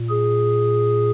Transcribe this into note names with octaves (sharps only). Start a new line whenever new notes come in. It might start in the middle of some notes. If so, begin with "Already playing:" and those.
Already playing: A#2
G#4